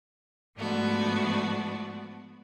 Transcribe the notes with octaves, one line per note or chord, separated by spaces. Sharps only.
G#2 F3 A3 B3 D4 F#4